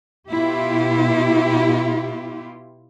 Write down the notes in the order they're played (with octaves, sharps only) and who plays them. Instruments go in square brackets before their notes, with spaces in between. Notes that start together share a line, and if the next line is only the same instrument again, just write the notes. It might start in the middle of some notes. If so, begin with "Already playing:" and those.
[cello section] B2 E4 F4 G4